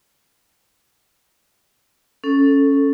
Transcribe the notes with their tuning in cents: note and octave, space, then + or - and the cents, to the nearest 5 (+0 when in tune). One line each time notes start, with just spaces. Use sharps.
C#4 +0 A4 +0